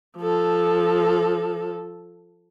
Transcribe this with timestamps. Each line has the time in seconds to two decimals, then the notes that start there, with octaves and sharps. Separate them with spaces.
0.18 F3 A4